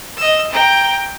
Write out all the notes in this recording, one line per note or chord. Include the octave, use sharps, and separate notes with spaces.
D#5 E6
G5 A#5